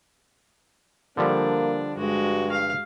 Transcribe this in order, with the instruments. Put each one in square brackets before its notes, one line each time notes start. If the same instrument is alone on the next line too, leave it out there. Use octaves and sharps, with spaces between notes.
[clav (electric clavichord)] D3 F3 G3 [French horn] A#3 [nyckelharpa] D4
[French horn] G2 [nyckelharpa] G#3 F#4
[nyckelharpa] F5